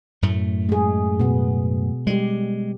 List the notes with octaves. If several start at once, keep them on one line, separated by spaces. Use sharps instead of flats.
F#2 A2 A3
G#3 G#4
B2 B3
G3 G#3 G4